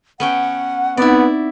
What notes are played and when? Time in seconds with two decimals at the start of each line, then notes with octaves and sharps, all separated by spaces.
0.20 B3 C#4 F#5 G5
0.97 B3 C4 D#4 E4 D5